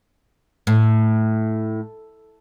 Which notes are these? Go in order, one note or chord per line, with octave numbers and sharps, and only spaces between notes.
A2